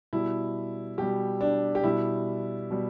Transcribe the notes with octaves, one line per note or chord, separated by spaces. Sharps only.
B2 G3 E4
B2 G3 G4
D4
G4
B2 G3 E4
B2 G3